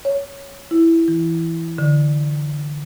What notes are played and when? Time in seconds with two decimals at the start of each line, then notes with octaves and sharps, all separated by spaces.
0.05 C#5
0.71 E4
1.08 E3
1.78 D3